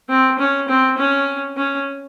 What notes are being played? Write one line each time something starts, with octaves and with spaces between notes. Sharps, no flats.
C4
C#4
C4
C#4
C#4